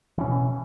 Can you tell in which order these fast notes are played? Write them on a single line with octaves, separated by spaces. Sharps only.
E3 C#4 B2